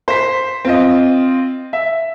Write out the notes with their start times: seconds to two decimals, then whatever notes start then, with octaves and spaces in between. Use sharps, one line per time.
0.08 C5 B6
0.65 C4 F4 D#5
1.73 E5